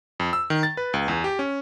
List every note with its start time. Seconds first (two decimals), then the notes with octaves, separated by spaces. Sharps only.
0.20 F2
0.33 E6
0.50 D#3
0.63 A6
0.77 B4
0.94 C#2
1.08 E2
1.24 G4
1.39 C#4